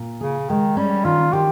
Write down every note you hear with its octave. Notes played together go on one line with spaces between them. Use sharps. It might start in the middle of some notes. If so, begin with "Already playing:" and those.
Already playing: A#2
C#3 G#4
D#3 G#3
G3 C#4
D#3 F4
D#3 G4